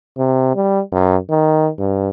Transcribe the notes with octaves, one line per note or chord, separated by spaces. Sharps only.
C3
G3
F#2
D#3
G2